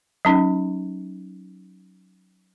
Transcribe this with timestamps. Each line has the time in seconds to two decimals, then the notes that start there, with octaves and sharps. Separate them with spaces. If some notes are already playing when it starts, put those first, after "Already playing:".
0.25 F#3 C#4 D#4